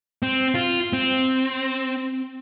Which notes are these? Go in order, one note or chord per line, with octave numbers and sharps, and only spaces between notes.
C4
F4
C4